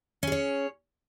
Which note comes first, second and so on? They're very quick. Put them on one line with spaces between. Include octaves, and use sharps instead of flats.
C#4 G#4 C#5